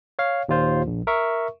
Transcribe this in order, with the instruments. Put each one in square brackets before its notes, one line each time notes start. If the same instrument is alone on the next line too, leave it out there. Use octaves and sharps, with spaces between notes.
[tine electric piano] C#5 F5
D#2 A#2 F4 C5
A#1
A#4 E5 C#6